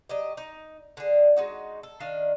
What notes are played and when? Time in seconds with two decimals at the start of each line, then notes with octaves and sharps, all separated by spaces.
0.09 F#3 G4 D#5
0.37 D#4
0.97 D3 G#4
1.36 G#3 D#4 F#4
1.83 A4
2.00 D#3 D4 D#5 F5